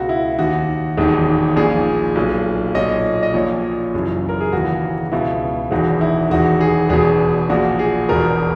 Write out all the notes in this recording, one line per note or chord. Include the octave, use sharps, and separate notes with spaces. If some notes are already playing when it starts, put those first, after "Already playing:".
Already playing: C#2 B2 F#4
E4
D#2 D#3 F#4
E1 D#2 D#3
A#1 A#2 G#4
B1 A#2
B1 A#2 D#5
D#5
A#1 A#2 C#5
F#1 F#2 E3
A#4
G#4
E1 D#2 C#3 E3 F#4
C#2 B2 E4
E1 E2 D#3 F#4
E4
E1 E2 D#3 F#4
G#4
E1 E2 B2 G#4
A#1 A#2 F#4
G#4
E1 E2 B2 A#4